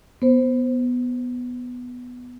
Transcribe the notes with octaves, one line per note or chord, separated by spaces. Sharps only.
B3 C5